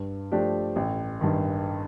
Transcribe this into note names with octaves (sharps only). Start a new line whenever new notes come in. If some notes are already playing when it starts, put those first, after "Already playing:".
Already playing: G2
F3 A3 D4 G4
A1
G2 D#3